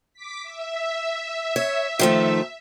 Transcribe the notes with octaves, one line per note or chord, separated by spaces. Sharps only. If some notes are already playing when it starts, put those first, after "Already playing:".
D6 B6
E5
C#5
D#3 F3 A3